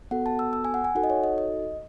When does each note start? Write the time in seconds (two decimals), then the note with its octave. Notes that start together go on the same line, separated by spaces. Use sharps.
0.11 B3 F#4 A4 F#5
0.26 A5
0.39 E6
0.53 E6
0.65 G#5
0.74 F#5
0.84 G#5
0.95 D#4 F#4 A4 F#5
1.04 D#5
1.10 C#5
1.24 D#5
1.38 D#5